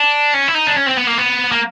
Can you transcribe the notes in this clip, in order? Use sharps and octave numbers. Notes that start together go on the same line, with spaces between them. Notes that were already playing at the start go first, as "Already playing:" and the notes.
Already playing: D4
C#4
E4
D#4
D4
C#4
C4
B3
A#3
B3
A#3